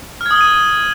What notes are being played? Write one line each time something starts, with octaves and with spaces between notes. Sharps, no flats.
D#6 F6 G#6 D#7 G7